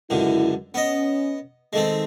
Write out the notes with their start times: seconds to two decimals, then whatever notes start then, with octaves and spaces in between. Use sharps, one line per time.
0.10 C#2 F#2 D3 E4
0.74 B3 C#4 D#5
1.73 D#3 G#3 A3 C4